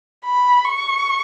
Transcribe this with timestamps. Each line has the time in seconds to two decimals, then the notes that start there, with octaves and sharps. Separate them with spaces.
0.25 B5
0.65 C#6